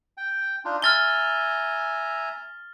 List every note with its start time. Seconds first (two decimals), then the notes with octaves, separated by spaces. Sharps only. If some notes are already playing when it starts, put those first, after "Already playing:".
0.17 G5
0.65 D4 D#4 F4
0.82 E5 G#5 A#5 F6 A6 G7